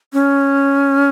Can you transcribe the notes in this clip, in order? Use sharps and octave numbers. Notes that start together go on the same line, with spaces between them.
C#4